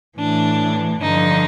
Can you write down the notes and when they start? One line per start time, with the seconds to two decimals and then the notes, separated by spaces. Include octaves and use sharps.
0.17 A2 E3 D4
1.00 G2 D3 F3 D#4